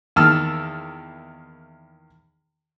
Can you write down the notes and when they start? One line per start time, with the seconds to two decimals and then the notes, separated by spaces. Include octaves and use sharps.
0.16 E2 D#3 A#3 A5 E6 F6